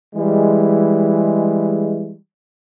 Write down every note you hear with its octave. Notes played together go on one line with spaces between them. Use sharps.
E3 G3 G#3